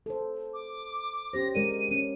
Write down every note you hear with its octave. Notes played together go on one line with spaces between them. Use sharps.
A4 C5
D6
C#4 G4 C5 A#6
G#3 A#4 D5 D#7
G#3 C#4